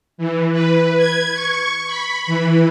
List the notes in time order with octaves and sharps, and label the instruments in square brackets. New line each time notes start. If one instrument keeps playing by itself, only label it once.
[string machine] E3
B4
G#6
C#6
B5
E3